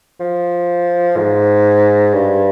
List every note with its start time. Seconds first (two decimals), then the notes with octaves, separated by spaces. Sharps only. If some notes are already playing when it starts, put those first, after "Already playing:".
0.20 F3
1.17 G#2
2.14 G2